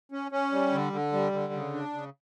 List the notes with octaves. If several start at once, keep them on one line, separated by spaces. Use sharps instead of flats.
C#4
C#4
G3
D3
D3
G3
D3
C#3
D4
C#3